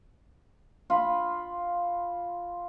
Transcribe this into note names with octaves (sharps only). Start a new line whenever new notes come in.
F4 B5